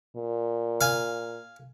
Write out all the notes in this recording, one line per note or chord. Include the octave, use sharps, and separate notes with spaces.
A#2
F5 G#5